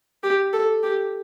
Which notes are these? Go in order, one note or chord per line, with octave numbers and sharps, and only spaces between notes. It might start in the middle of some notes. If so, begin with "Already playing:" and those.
G4
A4
G4